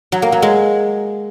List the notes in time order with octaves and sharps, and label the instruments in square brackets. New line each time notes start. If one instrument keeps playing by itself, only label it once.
[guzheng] F#3
A#3
F#3
G#3